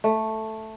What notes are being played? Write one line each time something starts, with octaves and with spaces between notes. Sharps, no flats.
A3